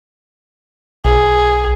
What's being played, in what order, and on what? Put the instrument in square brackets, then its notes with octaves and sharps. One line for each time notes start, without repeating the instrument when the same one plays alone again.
[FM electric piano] B1 [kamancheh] G#4